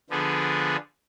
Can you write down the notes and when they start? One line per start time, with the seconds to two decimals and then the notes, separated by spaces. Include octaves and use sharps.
0.10 D3 F3 B3 D4 G#4